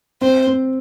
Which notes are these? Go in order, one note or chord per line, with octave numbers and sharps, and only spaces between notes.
C4 C5
C4